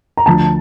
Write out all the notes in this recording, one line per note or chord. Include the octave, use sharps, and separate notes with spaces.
A#5
D2 D3 F3 A5